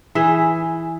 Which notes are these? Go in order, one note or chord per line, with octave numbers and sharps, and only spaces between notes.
E3 G#4 E5